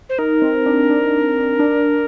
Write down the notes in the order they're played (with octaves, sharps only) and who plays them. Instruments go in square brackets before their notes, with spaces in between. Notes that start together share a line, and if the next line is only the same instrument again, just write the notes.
[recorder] C5
[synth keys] D#4 [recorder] A#4
[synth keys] C4
D4
D4
D4